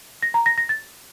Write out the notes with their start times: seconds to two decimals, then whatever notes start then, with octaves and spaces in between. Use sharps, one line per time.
0.22 A#6
0.34 A#5
0.46 A#6
0.58 A#6
0.69 A6